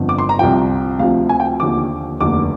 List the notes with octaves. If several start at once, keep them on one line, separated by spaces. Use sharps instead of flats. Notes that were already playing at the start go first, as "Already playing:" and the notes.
Already playing: G1 F2 D3 F3
D6
C6
A#5
C2 C3 F3 G5
D2 C3 F3 F5
G#5
G5
D#2 D3 F3 D6
F1 D#2 D3 D6